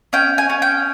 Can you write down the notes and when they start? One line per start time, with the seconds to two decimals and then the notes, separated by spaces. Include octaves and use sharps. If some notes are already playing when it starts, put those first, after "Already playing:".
0.13 C#4 G5
0.38 G#5
0.50 C#4
0.62 G5